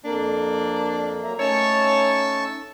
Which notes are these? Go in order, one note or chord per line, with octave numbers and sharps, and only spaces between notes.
F2 A#3 D4
F#3 E5 A#5
A3 C#4 D#4 C#5 A5 C#6 E6